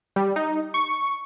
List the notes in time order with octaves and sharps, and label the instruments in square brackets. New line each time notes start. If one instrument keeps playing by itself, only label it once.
[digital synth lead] G3
D#4
C#6